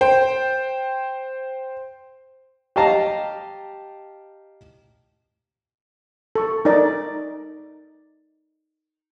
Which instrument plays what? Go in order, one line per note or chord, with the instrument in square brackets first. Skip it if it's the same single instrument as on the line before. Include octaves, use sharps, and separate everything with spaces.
[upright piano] C5 G5
[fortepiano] G4 D#5 F5 A5 A#5
[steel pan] A4 C#6
D#4 A#4 D5